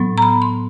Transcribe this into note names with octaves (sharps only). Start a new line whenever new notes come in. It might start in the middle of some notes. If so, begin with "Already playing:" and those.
Already playing: A2 F#3 B3
A#5
B5
C6